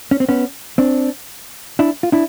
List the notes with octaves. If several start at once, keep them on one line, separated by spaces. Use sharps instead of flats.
C#4
C4
B3 C#4
C4 D4
D4 E4
F4
D4 E4